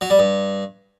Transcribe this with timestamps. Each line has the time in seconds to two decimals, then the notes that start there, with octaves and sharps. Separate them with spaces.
0.01 F#3
0.10 G3
0.19 G2